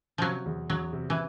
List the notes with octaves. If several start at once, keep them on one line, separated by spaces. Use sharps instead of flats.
C3 F3 F#3
E2
E2 F#3
C3
E3